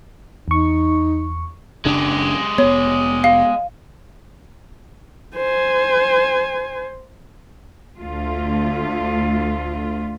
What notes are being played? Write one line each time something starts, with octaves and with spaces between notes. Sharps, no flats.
E2 D#4 C#6
F#1 C#3 G#3 D4 G4
F1 B3 C#5
F5
C5 G#5
D2 A3 F4